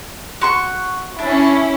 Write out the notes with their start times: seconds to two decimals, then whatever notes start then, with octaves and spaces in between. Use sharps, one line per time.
0.41 F#4 C6 C#6
1.19 C#4 D4 E4